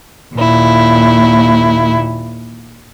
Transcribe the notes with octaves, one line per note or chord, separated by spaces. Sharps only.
D#2 A#2 E4